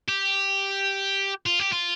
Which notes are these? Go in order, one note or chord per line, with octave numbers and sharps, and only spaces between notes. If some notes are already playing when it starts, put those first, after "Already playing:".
G4
F4
G4
F4